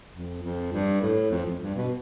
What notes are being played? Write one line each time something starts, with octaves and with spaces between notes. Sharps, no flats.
F2
F2
G2
A2
F2
F2
G2
B2